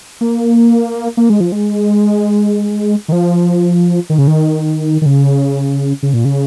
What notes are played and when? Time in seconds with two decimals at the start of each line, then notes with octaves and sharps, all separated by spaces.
0.21 A#3
1.17 A#3
1.30 G#3
1.40 F3
1.52 G#3
3.08 D#3
3.12 F3
4.10 D#3
4.18 C#3
4.27 D#3
5.02 D#3
5.06 C#3
6.03 C#3
6.14 A#2
6.25 C#3